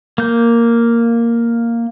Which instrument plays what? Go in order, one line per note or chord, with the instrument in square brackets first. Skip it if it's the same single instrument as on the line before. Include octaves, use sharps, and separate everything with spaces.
[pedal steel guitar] A#3 G6